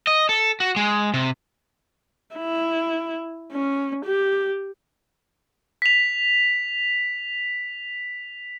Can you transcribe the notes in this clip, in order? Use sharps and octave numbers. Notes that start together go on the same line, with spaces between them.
D#5
A4
F#4
G#3
C3
E4
C#4
G4
B6 F7